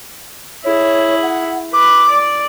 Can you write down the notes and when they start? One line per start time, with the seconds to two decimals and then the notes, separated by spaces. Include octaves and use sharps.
0.64 E4 G#4 C#5
1.22 F#5
1.73 B4 D6
2.09 D5